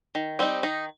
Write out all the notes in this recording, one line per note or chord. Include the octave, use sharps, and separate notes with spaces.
D#3
G3 C4 D#4
D#3 D#4